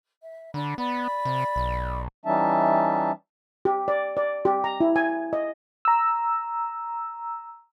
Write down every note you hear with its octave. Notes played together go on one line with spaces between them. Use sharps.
E5
D3 D4 B5
B3 D5 B5
C3
B1
E3 G3 C#4 D#4 E5 A5
G4
D5
D5
G4
A#5
E4
G#5
D#5
A#5 E6